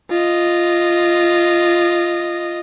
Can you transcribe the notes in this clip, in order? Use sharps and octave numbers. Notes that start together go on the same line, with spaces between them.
F4 D#5